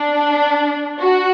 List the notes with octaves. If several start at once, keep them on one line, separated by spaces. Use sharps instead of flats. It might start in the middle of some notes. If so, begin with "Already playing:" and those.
Already playing: D4
F#4